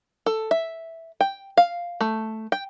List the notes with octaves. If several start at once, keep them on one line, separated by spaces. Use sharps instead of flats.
A4
E5
G5
F5
A3
G5